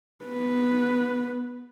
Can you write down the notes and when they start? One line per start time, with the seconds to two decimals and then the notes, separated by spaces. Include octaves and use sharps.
0.25 B3 B4